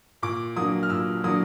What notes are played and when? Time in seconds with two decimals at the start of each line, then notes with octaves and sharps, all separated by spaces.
0.22 A#2 D6
0.56 F#3 A#3 D4 D#6
0.83 F6
0.90 A#2 E6
1.24 F#3 A#3 D4 D#6